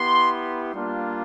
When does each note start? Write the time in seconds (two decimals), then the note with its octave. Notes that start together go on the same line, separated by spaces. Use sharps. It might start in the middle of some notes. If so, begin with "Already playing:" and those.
Already playing: B3 E4 G4 C6
0.74 G3 A#3 D4 F4